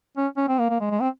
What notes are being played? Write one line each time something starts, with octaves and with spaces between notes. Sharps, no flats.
C#4
C#4
C4
A#3
A#3
G#3
G#3
C4